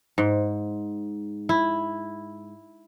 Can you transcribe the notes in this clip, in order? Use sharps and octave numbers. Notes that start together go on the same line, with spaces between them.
G#2
E4